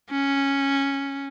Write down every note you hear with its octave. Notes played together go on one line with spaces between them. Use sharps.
C#4